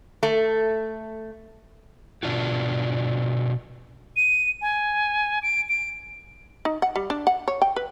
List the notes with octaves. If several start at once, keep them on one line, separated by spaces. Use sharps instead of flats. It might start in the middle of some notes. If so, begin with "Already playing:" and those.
A3
B2 D4 F4 F#4
D#7
G#5
D7
D7
D#4
F#5
G3
D4
F#5
C#5
G5
B4